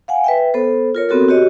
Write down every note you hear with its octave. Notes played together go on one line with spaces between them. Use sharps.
F5 F#5 G#5
B4 E5 G5
B3 A4 C5
F4 A#4 C#5
B3 C4 F#4 A4 A#4
F#4 G4 C#5 D#5